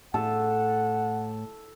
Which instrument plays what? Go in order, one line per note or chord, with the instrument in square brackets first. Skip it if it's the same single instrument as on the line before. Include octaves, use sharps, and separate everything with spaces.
[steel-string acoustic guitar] A2 [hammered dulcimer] A4 [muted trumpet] F#5